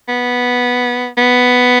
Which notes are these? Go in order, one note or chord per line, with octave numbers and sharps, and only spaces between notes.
B3
B3